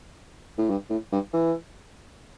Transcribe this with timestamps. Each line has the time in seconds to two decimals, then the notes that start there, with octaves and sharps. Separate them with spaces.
0.58 A2
0.70 G2
0.90 A2
1.12 G2
1.33 E3